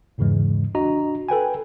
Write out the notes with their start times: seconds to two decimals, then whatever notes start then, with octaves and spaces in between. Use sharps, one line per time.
0.18 E2 G#2 C#3 E3 G#3
0.75 D4 F#4 D#5 A#5
1.29 A4 B4 G5 G#5